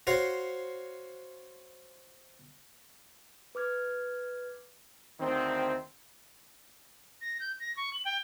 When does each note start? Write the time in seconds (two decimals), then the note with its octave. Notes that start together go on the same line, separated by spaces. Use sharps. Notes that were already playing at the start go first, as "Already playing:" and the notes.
0.07 F#4 C5 C#5 F5
3.55 B4 D6 F6 G#6
5.20 D2 D#3 C4
7.21 A#6
7.40 G6
7.60 A#6
7.77 C#6
7.93 F#7
8.05 G5